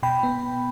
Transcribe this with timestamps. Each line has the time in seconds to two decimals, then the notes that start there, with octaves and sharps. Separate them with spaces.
0.03 B2 G5 B5
0.23 B3